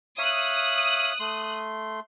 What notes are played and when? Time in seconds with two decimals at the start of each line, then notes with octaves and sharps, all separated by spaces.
0.18 C#5 E5 F5 D#6 F#6
1.20 A3 C6